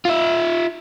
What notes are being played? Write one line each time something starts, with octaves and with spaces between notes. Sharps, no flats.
F4 E5